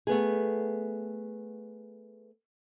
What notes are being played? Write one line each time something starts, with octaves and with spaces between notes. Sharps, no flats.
A3 B3 G#4